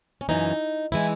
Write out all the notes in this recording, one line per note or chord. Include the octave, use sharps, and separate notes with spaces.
C#4
F#2 C#3 E3 D#4
E3 G#3 E4